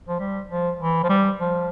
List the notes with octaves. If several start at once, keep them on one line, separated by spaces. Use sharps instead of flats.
F3
G3
F3
E3
F3
G3
F3